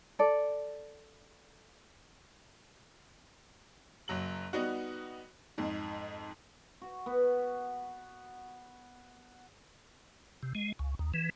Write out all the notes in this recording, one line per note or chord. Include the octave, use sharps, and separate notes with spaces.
A4 D5
F#1 F#3 F#7
G3 B3 D#4 F#4
F2 G#2
F#4
B3
C3
G#3
C#2
D#2
E3